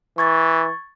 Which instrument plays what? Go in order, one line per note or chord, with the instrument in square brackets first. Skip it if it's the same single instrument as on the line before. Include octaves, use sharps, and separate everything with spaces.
[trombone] E3 [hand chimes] C#6 G#6 A6